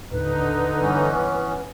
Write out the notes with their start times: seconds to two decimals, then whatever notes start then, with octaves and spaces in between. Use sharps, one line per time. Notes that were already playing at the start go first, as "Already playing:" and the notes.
0.11 D#1 A2 D3 D#4 B4
0.81 G2 E3 B3 C#4